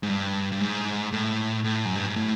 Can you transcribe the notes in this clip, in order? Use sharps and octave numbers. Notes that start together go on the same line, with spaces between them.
G#2
G2
G2
G#2
A2
A2
F#2
G2
G#2
A2